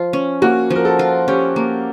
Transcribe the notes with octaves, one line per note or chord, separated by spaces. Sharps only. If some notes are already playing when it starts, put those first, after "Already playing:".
Already playing: F3 F4
C#4
A#3 F#4
F3
A#4
A4
F4
C#4 G4
A#3